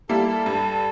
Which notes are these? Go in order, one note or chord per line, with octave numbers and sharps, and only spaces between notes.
G3 A#3 E4 A4
A4
G2